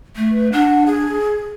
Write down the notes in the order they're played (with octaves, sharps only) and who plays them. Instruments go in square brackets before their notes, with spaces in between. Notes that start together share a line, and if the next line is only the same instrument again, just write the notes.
[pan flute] A3
[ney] B4
[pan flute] D4 [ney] F#5
[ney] G#4